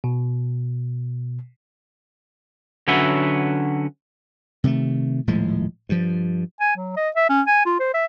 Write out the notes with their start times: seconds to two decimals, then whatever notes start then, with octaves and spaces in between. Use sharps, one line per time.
0.04 B2
2.88 D3 F#3 C#4 F#4 B4 E5
4.64 C3 D#3 G#3 A3
5.27 D#1 A2 F3 G#3
5.89 G2 F3
6.60 G#5
6.76 F#3
6.96 D#5
7.16 E5
7.29 C#4
7.47 G#5
7.66 F4
7.79 C5
7.94 E5